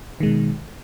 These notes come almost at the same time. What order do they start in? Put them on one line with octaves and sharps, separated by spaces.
D#3 G#3 B2